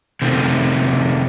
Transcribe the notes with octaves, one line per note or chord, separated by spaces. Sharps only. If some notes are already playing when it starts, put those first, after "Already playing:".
C3 D#3 A3